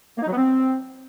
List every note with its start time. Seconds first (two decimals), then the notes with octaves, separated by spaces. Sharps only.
0.17 A#3
0.22 D#4
0.27 F#3
0.32 B3
0.37 C4